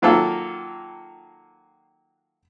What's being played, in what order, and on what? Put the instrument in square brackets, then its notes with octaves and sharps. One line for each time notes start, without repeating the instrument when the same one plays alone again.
[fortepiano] D#3 F#3 A#3 F4 A4